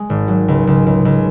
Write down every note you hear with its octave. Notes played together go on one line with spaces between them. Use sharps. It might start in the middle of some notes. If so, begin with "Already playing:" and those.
Already playing: G#3
G#1
F#3
C#2
C#2
C#2
C#2